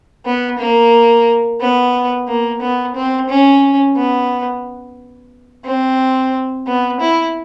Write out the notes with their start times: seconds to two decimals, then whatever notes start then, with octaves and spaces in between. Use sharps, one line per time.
0.26 B3
0.59 A#3
1.60 B3
2.28 A#3
2.62 B3
2.95 C4
3.29 C#4
3.97 B3
5.65 C4
6.67 B3
7.00 E4